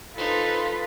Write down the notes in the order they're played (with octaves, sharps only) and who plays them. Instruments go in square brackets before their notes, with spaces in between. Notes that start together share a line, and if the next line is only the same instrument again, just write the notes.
[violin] D#4 C5 [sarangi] F4 [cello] A4 B4